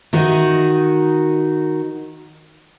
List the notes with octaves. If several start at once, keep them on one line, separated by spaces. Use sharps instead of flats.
D#3 D#4 F#4